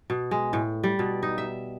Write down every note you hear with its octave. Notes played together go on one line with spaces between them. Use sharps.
B2
G#3
A2
G3
B2
D#4
E5